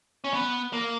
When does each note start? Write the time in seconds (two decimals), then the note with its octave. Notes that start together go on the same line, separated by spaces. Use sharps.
0.24 C#4
0.33 B3
0.73 A#3